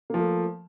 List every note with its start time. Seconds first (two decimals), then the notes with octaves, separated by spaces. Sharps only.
0.10 A#3
0.14 F3
0.18 A3